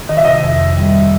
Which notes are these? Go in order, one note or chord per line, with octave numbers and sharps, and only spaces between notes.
D#3 D#5
E5
C3 D#5
F2
D#3
G3